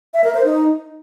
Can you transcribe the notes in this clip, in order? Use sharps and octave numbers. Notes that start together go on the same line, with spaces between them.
E5
A#4
C5
D#4